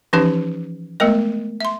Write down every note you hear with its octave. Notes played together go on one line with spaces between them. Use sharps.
E3 F3 C#4 D#4 G4 B4
G#3 A3 B3 A#4 D#5
E5 C6